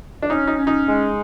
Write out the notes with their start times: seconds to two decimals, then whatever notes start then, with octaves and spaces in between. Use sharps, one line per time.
0.22 D4
0.29 C#4 D#4
0.47 D#4
0.57 C#4
0.67 D#4
0.86 G#3